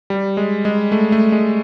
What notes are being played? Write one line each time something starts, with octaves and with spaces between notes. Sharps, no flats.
G3
G#3
G#3
A3
A3
G#3